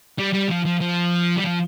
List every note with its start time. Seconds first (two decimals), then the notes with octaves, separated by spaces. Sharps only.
0.19 G3
0.34 G3
0.50 F3
0.66 F3
0.81 F3
1.37 G3
1.44 F3